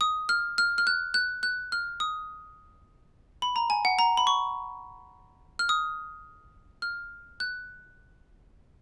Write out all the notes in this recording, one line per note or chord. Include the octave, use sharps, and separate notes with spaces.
D#6
F6
F6
F6
F#6
F#6
F#6
F6
D#6
B5
A#5
G#5
F#5
A#5
B5
C#6
F6
D#6
F6
F#6